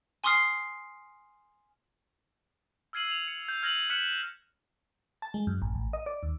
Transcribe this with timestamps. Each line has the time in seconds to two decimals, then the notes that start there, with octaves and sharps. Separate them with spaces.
0.24 G#5 C6 C#6 D#6 F6 C7
2.93 E6 F6 G#6 C7 D#7 F#7
3.11 F7
3.28 C#7
3.48 G6
3.63 F6 G#6 A#6 D#7 F#7
3.89 F6 F#6 B6 C#7 E7 F#7
5.22 A5
5.34 G#3
5.47 F#2
5.62 A1
5.75 A1
5.93 D#5
6.06 D5
6.23 D#2